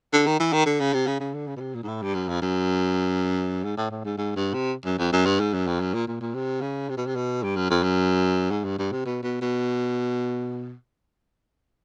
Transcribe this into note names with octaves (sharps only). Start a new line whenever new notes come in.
D3
D#3
E3
D#3
D3
C#3
C3
C#3
C#3
D3
C#3
B2
C3
A#2
G#2
A2
G2
F#2
F2
F#2
G#2
A2
A2
G#2
G#2
G2
C3
F#2
F2
F#2
G2
G#2
F#2
F2
F#2
A#2
A#2
A#2
C3
C#3
C3
B2
C3
B2
G2
F#2
F2
F#2
G#2
G2
G2
C3
B2
B2
B2